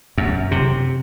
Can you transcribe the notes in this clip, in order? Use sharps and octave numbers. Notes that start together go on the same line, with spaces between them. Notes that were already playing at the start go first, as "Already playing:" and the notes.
F#2
C3